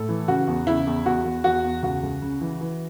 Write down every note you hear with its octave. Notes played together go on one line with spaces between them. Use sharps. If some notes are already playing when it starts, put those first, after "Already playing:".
Already playing: A2 A4
E3
C#3 F#4
E2
C#3 E4
E2
E2 F#4
E2
E2 F#4
E2
C#2 F#4
C#2
C#3
E3
E3